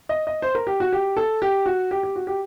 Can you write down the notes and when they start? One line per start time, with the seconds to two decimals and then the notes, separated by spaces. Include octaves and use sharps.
0.09 D#5
0.27 D#5
0.42 C5
0.55 A#4
0.67 G4
0.80 F#4
0.93 G4
1.17 A4
1.42 G4
1.66 F#4
1.91 G4
2.03 G4
2.16 F#4
2.27 G4